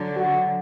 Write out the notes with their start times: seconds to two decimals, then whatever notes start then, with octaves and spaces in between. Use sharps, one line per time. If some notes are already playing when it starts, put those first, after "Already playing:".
Already playing: D3 F#3
0.16 F#4